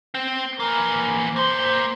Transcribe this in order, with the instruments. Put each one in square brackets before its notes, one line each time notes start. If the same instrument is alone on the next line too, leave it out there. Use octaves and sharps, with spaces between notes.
[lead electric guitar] C4
[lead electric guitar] E3 A#3 [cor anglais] A#4
[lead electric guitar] A#3 C6 [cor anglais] C5